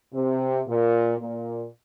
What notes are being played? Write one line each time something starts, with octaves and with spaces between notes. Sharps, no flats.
C3
A#2
A#2